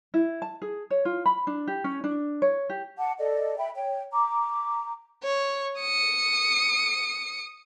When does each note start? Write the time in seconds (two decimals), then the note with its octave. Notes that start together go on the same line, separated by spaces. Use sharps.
0.14 E4
0.42 A5
0.62 G#4
0.90 C#5
1.05 F4
1.26 B5
1.47 D4
1.67 G4
1.84 C#4
2.04 D4
2.42 C#5
2.69 G4
2.98 F#5 A5 D6
3.18 A4 D5 D#5
3.57 E5 G5 B5
3.75 C#5 G5
4.12 A#5 D6
5.23 C#5
5.79 D#6 C#7